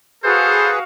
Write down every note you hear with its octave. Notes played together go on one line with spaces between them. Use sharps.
F#4 G#4 A4 B4 C5 F5